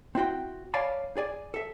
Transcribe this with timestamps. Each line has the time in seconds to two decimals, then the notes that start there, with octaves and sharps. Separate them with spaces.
0.15 C4 E4 F#4 G5
0.74 C#5 D5 F5 G#5 A5 B5
1.17 G#4 D5 G#5
1.54 A4 E5